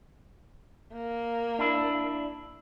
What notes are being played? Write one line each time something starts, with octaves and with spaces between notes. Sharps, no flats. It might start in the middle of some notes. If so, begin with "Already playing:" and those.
A#3
D4 E4